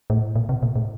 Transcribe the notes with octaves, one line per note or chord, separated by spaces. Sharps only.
A2
A#2
C3
A#2
A2